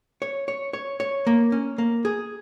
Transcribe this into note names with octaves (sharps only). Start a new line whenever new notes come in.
C#5
C#5
C#5
C#5
A#3
C#4
A#3
G#4